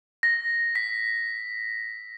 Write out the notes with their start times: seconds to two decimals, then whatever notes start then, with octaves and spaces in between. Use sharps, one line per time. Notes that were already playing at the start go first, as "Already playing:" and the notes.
0.23 A#6
0.75 B6